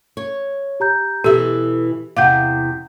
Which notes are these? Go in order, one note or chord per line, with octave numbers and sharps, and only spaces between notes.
C#5
G4 A#5 G6
B2 E3 G4 A4 E6
E2 C3 F5 F#5 D6 G6